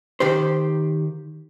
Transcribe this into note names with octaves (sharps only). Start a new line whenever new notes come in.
D#3 G4 C5